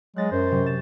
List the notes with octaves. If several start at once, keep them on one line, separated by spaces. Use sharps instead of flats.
F#3 G#3 F#6 A6 A#6
F#2 C5
C3 F#3
A6 E7